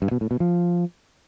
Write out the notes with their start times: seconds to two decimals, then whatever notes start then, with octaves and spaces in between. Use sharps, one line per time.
0.02 G2
0.11 B2
0.21 A2
0.31 B2
0.40 F3